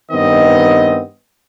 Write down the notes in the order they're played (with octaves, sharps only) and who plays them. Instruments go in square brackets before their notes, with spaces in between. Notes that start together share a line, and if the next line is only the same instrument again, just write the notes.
[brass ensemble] G2 D#3 B3 C4 D#5